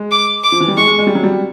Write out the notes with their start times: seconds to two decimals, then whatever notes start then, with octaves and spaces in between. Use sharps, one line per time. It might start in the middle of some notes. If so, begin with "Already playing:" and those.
Already playing: G#3
0.11 D6
0.44 D6
0.52 F3
0.60 E3
0.68 G3
0.77 G#3 C#6
0.87 G#3
0.98 G#3
1.07 G3
1.15 F#3
1.23 G3